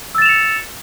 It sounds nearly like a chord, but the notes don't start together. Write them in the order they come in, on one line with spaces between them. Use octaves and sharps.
E6 A6 E7 F7 C#7